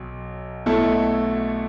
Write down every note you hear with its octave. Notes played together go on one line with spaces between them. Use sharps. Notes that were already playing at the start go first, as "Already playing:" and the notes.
Already playing: B1 F#3
B1 B2 A3 E4 A4